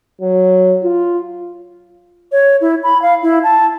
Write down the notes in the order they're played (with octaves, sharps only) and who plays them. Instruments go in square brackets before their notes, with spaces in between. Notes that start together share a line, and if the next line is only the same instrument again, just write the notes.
[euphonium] F#3
F4
[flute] C#5
E4
B5
F5
E4
A5